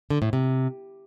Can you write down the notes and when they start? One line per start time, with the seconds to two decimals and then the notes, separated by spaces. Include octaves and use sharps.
0.10 D3
0.22 A2
0.33 C3